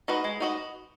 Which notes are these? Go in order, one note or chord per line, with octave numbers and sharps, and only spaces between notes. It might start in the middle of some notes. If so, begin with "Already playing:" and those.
D#4 F#4 B4 D#5
G#3
D#4 F#4 B4 D#5